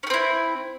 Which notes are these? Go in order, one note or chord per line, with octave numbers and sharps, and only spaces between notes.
A3 C4 C#4 E4